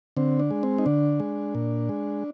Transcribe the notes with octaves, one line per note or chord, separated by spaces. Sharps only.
D3 C4
D4
G#3
C4
D#4
D3 D4
G#3
A#2
G#3